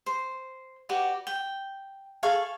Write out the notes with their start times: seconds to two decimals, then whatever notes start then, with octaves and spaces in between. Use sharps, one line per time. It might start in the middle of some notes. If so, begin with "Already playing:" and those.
0.06 C5
0.89 F#4 G4 B4 D5
1.27 G5
2.23 G#4 A4 F5 C#6